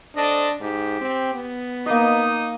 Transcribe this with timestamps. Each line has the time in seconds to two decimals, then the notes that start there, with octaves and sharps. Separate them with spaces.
0.16 C4 D4 A4 D#5
0.61 G#2 G4
1.01 C4
1.34 B3
1.86 A#3 D#4 D#5